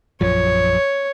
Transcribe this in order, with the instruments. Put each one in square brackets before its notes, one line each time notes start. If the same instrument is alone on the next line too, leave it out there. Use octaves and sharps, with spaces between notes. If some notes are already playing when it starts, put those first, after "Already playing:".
[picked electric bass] A#1 F#2 F3 [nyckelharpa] C#5